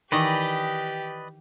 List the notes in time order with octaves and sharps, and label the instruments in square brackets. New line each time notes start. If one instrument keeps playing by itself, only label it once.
[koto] D#3 E3 [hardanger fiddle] G4 [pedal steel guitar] B4 D5 D#5